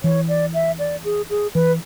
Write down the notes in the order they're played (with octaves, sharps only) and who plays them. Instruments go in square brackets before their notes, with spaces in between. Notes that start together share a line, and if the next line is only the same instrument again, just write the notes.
[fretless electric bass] E3 [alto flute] C#5
[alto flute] D5
E5
D5
G#4
G#4
[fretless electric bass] E3 [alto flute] B4